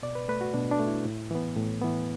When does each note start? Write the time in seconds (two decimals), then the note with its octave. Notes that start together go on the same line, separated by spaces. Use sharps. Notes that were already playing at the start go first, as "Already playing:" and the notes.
0.03 B2 D5
0.15 B4
0.29 A3 B4
0.41 F#4
0.54 B2 D4
0.71 D4
0.79 A3
0.88 E4
1.05 A2
1.31 E3 B3
1.57 A2
1.82 E3 B3